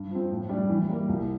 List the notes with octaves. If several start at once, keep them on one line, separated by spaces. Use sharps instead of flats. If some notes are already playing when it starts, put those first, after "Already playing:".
Already playing: G2
F3 C4
A2
G3 D4
E3
G3 A#3
C2